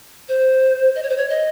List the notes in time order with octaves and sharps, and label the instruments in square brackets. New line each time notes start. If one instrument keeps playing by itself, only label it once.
[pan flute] C5
D#5
C#5
C5
C#5
D#5